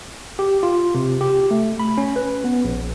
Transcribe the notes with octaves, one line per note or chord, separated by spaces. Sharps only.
G4
F4
C3
G4
A3
B5
C#4
B4
B3
A#1